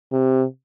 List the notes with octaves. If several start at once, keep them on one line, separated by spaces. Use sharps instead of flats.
C3